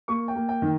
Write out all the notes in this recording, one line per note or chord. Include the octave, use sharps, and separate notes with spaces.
A#3 C#6
G5
A#3
G5
D#3